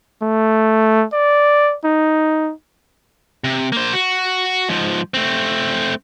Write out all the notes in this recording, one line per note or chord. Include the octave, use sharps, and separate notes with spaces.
A3
D5
D#4
C3
A#3 C5
F#4
G#2 F3
A3 C4